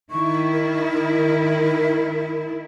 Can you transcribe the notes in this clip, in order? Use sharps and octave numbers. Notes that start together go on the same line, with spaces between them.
D#3 E4 C#6
A#4